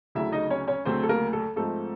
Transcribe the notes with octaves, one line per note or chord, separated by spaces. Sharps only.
D2 C#3 F#3 A3 E4 E5
D#4 D#5
C#4 C#5
C#4 C#5
D2 C#3 F#3 A3 C4 C5
A4
A#3 A#4
A4
G#2 F3 A3 C4 A4